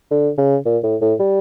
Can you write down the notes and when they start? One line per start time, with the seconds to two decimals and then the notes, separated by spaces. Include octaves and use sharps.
0.11 D3
0.38 C#3
0.65 A#2
0.83 A2
1.01 A2
1.20 G3